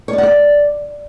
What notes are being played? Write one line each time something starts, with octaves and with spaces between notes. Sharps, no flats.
C#5
D5
F#5
D5